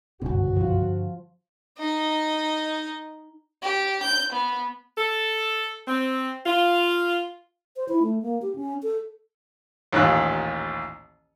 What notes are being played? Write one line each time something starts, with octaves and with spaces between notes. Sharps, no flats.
F#1 C2 G2 B2 D3 F#4
F3 F4
D#4 D#5
G4
G6
B3
A4
C4
F4
C5
E4
A3
A#3
G4
C#4
A4
A1 D#2 A#2 F#6